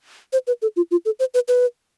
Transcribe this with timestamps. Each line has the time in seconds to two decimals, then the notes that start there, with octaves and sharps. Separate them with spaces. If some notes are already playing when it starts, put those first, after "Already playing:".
0.33 C5
0.47 B4
0.62 A4
0.76 F4
0.91 F4
1.05 A4
1.19 C5
1.34 B4
1.48 B4